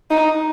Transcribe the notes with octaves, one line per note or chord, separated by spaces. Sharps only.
D#4